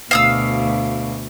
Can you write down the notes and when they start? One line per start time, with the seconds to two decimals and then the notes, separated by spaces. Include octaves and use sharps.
0.11 D2 B2 F5 D#6 E6